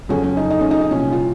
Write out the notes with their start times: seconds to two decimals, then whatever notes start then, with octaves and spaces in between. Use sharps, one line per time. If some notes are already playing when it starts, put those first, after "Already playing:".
0.09 F2 C#3 F#3 C#4
0.23 C#4
0.37 D#4
0.50 D#4
0.61 C#4
0.71 D#4
0.81 D#4
0.91 C2 A#2 F3 C#4
1.12 F4